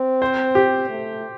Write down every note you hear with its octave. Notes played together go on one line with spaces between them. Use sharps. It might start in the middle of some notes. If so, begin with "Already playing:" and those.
Already playing: C4
C5
G4
A3